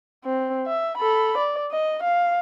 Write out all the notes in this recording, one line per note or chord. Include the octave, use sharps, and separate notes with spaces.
C4
E5
A4 B5
D5
D#5
F5